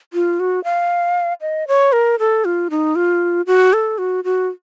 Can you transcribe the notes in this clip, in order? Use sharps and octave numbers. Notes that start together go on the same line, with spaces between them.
F4
F#4
F5
D#5
C#5
A#4
A4
F4
D#4
F4
F#4
A4
F#4
F#4